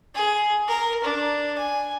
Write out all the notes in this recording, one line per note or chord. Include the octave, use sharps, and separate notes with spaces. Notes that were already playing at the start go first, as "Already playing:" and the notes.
G#4
A#4
D4
G#5